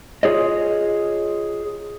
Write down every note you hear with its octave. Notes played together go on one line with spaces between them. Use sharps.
F4 G#4 C#5 D#5